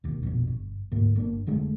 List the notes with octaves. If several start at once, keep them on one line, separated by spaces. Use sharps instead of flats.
E1 D#2
A#1 F2 B2
G1
D2 G#2 A#3
G1 A#3 D4
F1 D3 G#3 A3